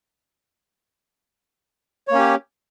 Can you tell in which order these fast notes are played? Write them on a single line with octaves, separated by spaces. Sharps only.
C#5 A#3 C#4 G4